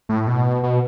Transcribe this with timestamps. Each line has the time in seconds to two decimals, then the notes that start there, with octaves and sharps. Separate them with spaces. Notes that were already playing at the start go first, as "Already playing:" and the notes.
0.09 A2
0.27 B2
0.63 B2